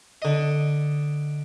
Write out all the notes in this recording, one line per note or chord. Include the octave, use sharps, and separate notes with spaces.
D3 D#5